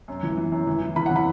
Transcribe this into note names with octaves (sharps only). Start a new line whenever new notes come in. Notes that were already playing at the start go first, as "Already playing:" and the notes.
F#2
E3
E3
F#2
E3
E3
E3 B5
F#5
E3
B5